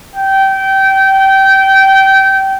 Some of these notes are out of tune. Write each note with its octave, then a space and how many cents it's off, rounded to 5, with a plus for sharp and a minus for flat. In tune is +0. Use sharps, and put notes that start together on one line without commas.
G5 -25